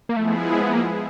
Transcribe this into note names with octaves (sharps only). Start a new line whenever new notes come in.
A#3
F3 G#3 A3 B3 E4 G#4
B3
A#3